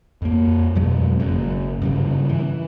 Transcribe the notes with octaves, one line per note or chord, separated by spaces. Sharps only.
F2 A#3
F2 B2 F#3 G#3
F#1 F#2
G2 C#3 G3
E3